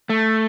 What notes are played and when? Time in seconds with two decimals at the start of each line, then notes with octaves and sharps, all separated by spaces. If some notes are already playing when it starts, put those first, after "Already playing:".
0.09 A3